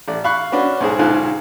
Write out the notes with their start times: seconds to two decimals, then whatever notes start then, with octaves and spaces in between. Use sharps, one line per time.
0.08 A1 D5
0.24 F5 B5 C#6 F6 F#6
0.52 C#4 D4 F#4 B4
0.80 B1 G#2 G#4
0.99 B1 G#2 D3 F4 G#5 F#6